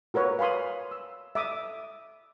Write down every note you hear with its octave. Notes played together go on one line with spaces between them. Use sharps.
F#4 A#4 B4 C#5
F5 G#5 B5 C6 D#6
E6
E5 D6 D#6